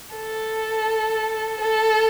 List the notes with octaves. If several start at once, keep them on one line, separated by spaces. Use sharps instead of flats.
A4
A4